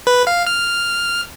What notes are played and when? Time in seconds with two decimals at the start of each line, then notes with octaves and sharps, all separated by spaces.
0.07 B4
0.27 F5
0.46 F6